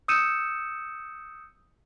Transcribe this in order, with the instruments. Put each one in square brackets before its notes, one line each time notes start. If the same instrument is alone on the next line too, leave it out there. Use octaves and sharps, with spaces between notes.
[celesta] D#6 E6 G6 C#7 D#7 E7